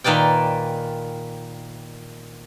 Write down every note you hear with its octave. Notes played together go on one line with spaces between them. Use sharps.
A#2 D#3 B4 D5 G5